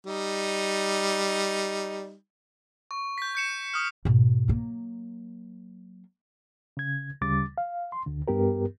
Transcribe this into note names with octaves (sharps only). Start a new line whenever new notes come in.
G3 D#4
C#6
G6 B6
G6 C#7 E7
D#6 F6
G#2 B2
F#3 A#3
C#3 G#6
D2 C#3 G3 D6 A6
F5
C6
D2 D3
G2 B3 G4 A#4